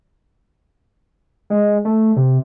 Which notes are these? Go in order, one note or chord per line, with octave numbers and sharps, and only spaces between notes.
G#3
A3
C3